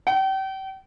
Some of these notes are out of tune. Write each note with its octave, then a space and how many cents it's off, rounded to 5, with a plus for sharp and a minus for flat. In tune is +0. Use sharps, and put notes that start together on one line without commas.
G5 -35